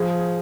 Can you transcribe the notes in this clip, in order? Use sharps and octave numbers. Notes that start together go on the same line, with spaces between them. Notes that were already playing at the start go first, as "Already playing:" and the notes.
Already playing: F3 G#4